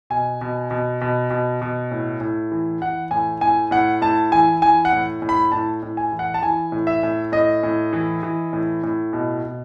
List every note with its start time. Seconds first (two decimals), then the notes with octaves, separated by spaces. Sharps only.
0.10 B2 G#5
0.41 B2
0.71 B2
1.01 B2
1.31 B2
1.62 B2
1.91 A2
2.21 A2
2.52 E3
2.81 E3 F#5
3.11 A2 G#5
3.41 A2 G#5
3.71 A2 F#5
4.01 A2 A5
4.31 E3 G#5
4.62 E3 G#5
4.85 F#5
4.92 A2
5.22 A2
5.29 B5
5.52 A2 A5
5.82 A2
5.97 G#5
6.12 E3
6.19 F#5
6.34 A5
6.42 E3 G#5
6.72 A2
6.87 E5
7.03 A2
7.32 A2 D#5
7.63 A2
7.93 E3
8.23 E3
8.53 A2
8.83 A2
9.13 B2
9.44 B2